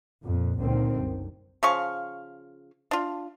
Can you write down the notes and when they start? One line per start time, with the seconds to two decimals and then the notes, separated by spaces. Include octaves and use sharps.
0.23 F2 A#2
0.58 C#2 A#2 D3 D#3 C4
0.94 F#1 C2
1.63 C#3 F3 F5 C#6
2.91 D4 F4